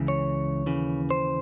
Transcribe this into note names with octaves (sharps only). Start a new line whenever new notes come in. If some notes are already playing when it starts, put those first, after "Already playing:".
Already playing: C#2 C#3 E3
C#5
D#2 C#3 E3
C5